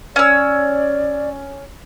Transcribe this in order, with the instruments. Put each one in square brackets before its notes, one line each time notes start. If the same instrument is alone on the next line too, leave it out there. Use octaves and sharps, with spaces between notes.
[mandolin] C#4 E6 [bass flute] D5